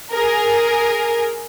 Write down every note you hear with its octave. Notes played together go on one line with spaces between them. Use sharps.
G#4 A#4